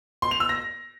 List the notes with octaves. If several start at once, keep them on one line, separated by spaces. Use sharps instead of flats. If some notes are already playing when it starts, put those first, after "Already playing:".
C6
F7
E6
A#6